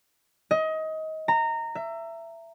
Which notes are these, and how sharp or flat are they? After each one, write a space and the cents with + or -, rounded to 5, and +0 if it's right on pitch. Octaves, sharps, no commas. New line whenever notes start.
D#5 +25
A#5 -20
E5 +20